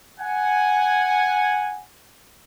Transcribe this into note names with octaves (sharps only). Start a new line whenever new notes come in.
F#5 G#5